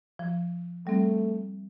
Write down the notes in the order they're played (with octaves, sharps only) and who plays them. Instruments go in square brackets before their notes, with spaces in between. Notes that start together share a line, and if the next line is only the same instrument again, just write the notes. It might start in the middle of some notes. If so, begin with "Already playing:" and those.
[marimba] F3
[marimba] G3 C4 [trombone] A3